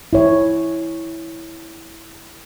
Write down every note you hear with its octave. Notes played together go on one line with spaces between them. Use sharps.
E4 C#5